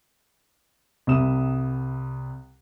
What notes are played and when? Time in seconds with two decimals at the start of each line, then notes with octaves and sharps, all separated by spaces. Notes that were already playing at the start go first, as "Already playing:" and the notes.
1.07 C2 C3 G3 E5 D#6 E7